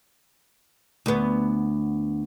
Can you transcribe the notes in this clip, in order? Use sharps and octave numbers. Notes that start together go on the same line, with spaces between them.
D2 B3